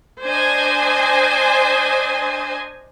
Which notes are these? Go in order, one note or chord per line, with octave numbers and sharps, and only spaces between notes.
D4 C5 D#5 G#5